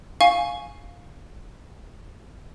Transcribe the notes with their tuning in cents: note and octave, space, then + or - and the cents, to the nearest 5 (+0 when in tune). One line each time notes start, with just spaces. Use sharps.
F5 +10 G#5 +0 C#6 +0